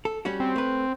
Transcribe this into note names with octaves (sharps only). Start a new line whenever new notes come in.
A4
G3 C#4 F#4
C4
A3 B4